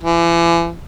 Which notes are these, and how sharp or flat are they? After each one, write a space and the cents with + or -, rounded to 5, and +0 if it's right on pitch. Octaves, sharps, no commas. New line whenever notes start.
E3 +40